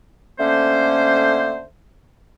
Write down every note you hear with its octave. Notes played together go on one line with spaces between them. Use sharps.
D3 A3 A#3 C#4 C5